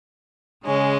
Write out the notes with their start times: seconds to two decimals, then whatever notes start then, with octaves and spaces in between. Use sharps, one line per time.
0.66 C#3 G#3 C#4